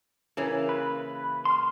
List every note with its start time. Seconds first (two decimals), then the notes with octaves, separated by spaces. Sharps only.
0.37 C#3 E3 A#3
0.69 B4
1.45 C6 F6